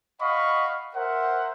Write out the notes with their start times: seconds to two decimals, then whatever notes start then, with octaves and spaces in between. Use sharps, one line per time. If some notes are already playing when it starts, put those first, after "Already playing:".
0.21 D#5 F5 F#5 B5 C#6
0.95 A#4 C5 E5 F#5